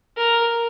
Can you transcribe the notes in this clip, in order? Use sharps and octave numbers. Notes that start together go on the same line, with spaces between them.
A#4